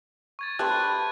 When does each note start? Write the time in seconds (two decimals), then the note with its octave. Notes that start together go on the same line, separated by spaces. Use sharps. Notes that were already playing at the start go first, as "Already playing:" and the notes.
0.39 C#6 G#6 A6
0.59 A3 D4 G4 B4 C6 F#6